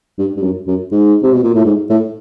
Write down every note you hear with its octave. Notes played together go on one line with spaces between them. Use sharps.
G2
G2
F#2
F#2
G#2
C3
B2
A#2
A2
G#2
A2